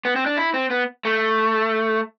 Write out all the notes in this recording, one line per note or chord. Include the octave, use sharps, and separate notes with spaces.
B3
C4
D4
E4
C4
B3
A3